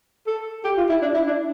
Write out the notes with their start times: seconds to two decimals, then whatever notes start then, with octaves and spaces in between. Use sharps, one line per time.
0.27 A4
0.65 G4
0.77 F4
0.89 E4
1.02 D4
1.14 E4
1.27 D4